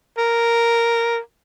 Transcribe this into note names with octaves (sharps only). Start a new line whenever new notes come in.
A#4